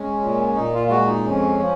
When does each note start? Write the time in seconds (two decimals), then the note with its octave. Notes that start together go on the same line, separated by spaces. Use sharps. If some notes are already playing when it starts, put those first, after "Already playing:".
Already playing: G#3 C#4
0.21 A#2
0.55 A#2 D#4
0.73 F4
0.87 F4
0.90 G#3 F#4
1.07 D#4
1.25 F2 C#4
1.60 F3